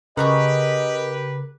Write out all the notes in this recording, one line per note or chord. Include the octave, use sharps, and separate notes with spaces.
C#3 G4 G#4 A#4 B4 C#5 D#5 F#5